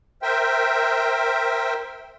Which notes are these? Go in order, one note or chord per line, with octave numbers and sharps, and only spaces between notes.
A#4 C5 E5 G5